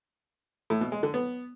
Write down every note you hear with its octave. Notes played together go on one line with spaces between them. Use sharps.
A2
B2
G#3
D3
B3